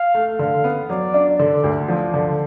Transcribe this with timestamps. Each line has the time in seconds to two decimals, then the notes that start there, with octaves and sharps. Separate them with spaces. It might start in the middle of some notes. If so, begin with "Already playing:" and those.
Already playing: F5
0.15 A3
0.39 D3 F5
0.64 B3
0.90 F#3 D5
1.14 D4
1.39 D3 D5
1.64 D2
1.88 F3 D5
2.14 D3